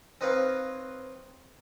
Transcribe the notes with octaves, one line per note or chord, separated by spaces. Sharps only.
C4 D#4 B4 C#5 F5